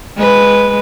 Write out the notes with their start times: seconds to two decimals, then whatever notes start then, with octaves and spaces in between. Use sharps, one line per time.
0.17 G#3 B4